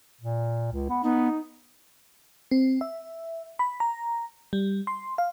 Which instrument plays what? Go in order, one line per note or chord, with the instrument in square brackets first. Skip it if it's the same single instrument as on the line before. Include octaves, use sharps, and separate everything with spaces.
[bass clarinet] A#2
C#2
B3
[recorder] B3 [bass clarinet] D#4
[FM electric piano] C4
E5
B5
A#5
G3
C6
F5